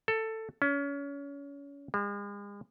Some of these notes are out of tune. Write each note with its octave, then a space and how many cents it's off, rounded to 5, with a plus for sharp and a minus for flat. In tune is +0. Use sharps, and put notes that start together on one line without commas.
A4 +15
C#4 +30
G#3 -45